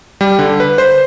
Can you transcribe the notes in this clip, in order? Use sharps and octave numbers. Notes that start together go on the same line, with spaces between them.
G3
D3
B4
C5